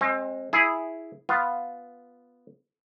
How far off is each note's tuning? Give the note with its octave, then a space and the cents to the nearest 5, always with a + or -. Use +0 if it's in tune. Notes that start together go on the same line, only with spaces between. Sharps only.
G#3 +0 C4 +30
E4 +0 G#4 +0
B3 +0 F4 +0